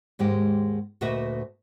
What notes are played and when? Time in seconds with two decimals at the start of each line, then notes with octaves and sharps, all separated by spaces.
0.19 D#2 G#2 G#3 G4
1.01 D2 A#2 F#4 B4 D#5 E5